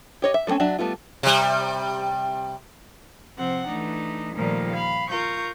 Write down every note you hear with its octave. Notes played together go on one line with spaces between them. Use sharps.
G4 C#5 D#5
E5
G3 A3 A#3 C4 C#4
F#3 D4 E5 A5
G3 A3 B3 F4
C3 G3
C3 F3 C4 C5 F#5
E3 A3 D4 D#4
A#2 D#3 F3 G3 A3 A#3
F5 B5
F4 A#4 C#6 G6